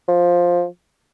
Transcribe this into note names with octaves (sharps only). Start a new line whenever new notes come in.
F3